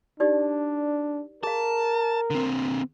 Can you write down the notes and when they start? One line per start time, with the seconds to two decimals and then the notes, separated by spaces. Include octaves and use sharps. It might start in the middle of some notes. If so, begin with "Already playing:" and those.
0.20 D4 D#4 G4 D5
1.43 G#4 A#4 F5 A5
2.30 D3 C4